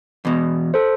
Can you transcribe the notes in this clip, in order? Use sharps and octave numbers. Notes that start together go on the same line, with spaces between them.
E2 B2
A4 C5